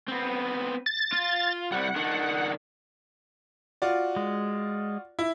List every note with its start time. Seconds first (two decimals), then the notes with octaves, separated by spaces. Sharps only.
0.08 B3 C4
0.86 A6
1.13 F4
1.72 C2 G3 F#5
1.96 D#3 D4
3.82 F4 F#4 D5
4.16 G#3
5.19 E4